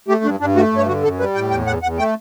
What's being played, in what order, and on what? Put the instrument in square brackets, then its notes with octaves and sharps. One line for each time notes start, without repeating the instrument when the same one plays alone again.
[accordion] A3 G4
G2 D4
G2 D4
A3 F#4
G2 C#5
D3 F#4
F#2 A4
G3 B4
A2 G5
E2 G5
E2 F#5
E2 F#5
A3 G5